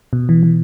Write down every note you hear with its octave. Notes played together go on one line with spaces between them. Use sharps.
B2
E3
E3